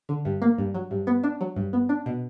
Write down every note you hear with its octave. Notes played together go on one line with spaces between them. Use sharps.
D3
G2
A#3
G2
F#3
G2
B3
D4
F#3
G2
B3
D4
B2